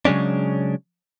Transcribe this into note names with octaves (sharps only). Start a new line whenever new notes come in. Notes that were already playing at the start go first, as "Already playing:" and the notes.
C#3 F#3 G#3 C#4 D4